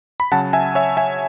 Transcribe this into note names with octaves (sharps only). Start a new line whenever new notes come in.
B5
C#3 F#3 F#5 A5
E5 G#5
C#5 E5
E5 G#5